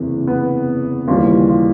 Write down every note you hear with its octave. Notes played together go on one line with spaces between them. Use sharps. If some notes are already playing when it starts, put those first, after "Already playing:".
Already playing: F#1 E2 C3 E3
B3
D#2 C#3 E3 G3 F4
F4